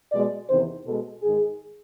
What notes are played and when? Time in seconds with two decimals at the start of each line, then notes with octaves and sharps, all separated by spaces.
0.12 B2 G#3 D5
0.48 E2 C3 D#3 C5
0.85 B2 G#3 A4
1.23 G#2 D#3 G#3 G#4